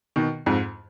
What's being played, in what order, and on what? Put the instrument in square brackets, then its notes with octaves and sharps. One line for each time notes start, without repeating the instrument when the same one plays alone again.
[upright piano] B2 D#3
F2 G#2